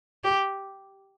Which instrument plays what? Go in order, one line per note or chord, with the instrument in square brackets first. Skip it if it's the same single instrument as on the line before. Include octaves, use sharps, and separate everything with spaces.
[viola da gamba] G4